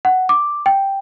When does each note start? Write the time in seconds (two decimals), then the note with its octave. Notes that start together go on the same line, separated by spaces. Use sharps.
0.05 F#5
0.29 D6
0.66 G5